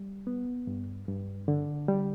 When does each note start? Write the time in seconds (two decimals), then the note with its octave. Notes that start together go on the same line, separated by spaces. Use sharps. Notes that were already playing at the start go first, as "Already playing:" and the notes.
Already playing: G3
0.27 B3
0.67 G2
1.08 G2
1.48 D3
1.88 G3